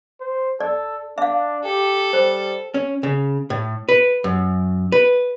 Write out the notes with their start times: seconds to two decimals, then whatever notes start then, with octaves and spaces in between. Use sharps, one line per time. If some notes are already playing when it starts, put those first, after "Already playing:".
0.20 C5
0.60 A4 D5
1.18 D4 E5 F5
1.64 G4 A4
2.13 G3 C5
2.74 C#4
3.03 C#3
3.50 A2
3.89 B4
4.24 F#2
4.92 B4